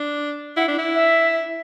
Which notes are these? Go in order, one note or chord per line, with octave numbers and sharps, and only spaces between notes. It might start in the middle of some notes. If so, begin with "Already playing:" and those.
Already playing: D4
E4 F#5
D4
E4
E5